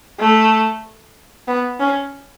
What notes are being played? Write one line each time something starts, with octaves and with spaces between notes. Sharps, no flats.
A3
B3
C#4